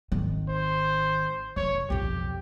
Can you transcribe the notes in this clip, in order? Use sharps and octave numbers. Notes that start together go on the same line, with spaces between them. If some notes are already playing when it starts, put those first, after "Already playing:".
G#1 D#3
C5
F1 E3 C#5
B1 F2 G4